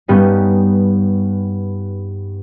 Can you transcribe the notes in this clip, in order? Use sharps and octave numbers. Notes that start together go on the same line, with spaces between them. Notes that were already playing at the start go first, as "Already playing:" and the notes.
G2 G3 B3 C#4 D#4